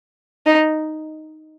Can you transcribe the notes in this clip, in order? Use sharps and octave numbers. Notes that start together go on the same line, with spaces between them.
D#4